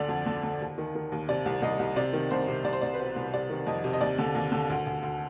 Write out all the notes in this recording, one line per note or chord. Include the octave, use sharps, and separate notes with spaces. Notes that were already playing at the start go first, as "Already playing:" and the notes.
Already playing: D2 D3 D5
F2
D3
D3
D#2
D#3
D#3
D#2
C3 D5
C2
C2 D#5
C2
C3 D5
D#3
C2 C5
C3
C2 D5
C5
C2 D5
B4
B2 C5
C2
C3 D5
D#3
F2 D#5
C3
D#5
D#2 D5
D3
D#2
D3
D2
D2
D2